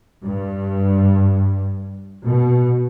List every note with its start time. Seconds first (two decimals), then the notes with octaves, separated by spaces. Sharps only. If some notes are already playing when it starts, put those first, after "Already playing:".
0.24 G2
2.25 B2